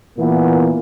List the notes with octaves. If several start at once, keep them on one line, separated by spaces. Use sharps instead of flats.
A#2 E3 A#3 B3